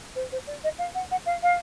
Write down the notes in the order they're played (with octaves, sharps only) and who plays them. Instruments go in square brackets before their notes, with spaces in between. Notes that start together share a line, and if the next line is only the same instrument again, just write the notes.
[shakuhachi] C5
C5
D5
D#5
F5
F#5
F#5
F5
F5